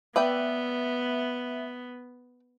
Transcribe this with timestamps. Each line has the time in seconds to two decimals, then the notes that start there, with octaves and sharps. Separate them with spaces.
0.16 B3 B4 D5 E5 G5